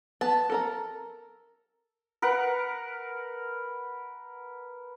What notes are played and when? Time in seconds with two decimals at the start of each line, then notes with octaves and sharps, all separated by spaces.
0.21 B3 A5
0.50 A4 A#4 A#5
2.22 A#4 B4 F#5